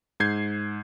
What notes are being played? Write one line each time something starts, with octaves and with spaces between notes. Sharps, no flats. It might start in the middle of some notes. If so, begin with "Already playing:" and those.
G#2 G6 G#6 C7